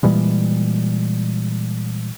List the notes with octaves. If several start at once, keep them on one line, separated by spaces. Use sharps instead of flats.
A#2 E3 G3 G#3